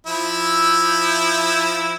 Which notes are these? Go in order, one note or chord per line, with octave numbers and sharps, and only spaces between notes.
F3 E4 E5